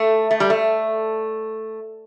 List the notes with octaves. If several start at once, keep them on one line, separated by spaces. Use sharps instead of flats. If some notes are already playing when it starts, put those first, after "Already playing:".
Already playing: A3
A3
G3
A3